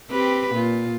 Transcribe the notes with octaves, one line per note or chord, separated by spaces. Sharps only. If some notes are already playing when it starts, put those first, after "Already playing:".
C4 G4 B4
A#2 F4